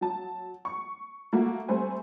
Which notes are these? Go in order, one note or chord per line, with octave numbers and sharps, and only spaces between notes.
F#3 A5
C#6
A3 A#3 F#4
G3 A3 C4 C5 G#5